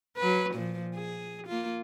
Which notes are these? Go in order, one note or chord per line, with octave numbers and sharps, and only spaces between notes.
F#3 B4
A#2 F3
G#4
A#3 F4